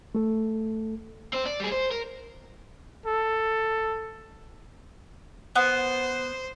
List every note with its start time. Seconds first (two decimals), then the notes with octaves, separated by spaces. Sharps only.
0.15 A3 A4
1.33 C4 C5
1.45 D5
1.60 G3 G#4
1.72 C5
1.91 A#4
3.06 A4
5.56 B3 C5